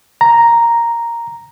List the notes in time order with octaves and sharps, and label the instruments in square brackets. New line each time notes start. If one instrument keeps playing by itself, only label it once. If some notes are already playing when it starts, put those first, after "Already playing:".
[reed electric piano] A#5